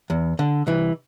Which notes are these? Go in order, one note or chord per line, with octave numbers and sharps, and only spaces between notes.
E2
D3
C2 E3